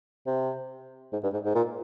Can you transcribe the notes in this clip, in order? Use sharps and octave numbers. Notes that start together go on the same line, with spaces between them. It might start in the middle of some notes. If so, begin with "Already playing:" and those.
C3
G#2
G2
G#2
G#2
A#2